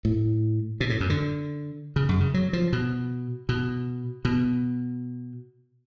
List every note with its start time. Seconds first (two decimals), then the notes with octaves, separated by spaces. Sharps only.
0.05 A2
0.80 B2
0.90 A2
1.00 F#2
1.10 D3
1.96 C#3
2.09 F#2
2.20 C#3
2.34 F#3
2.53 F3
2.73 B2
3.49 B2
4.25 B2